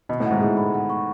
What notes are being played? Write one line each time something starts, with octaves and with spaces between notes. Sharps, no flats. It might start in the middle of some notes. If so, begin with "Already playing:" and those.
B2 D#5
A2
G#2 F#5
A2 G#4
B5
F#5
C#6